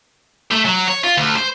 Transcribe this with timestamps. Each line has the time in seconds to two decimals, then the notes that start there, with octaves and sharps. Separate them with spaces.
0.52 A3
0.65 F#3
0.87 C#5
1.04 F4
1.17 D2
1.36 C5